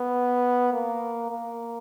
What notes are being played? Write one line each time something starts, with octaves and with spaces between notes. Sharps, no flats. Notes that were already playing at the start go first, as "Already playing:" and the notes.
Already playing: B3
A#3
A#3